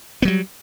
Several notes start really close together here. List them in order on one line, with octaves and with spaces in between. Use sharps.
B3 F#3 G3